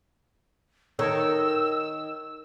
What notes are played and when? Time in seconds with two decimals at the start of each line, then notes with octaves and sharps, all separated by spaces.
0.99 D#3 A4 A#4 C#5 E6